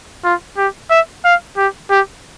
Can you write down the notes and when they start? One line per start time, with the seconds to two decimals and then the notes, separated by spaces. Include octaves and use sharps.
0.24 F4
0.57 G4
0.90 E5
1.24 F5
1.57 G4
1.90 G4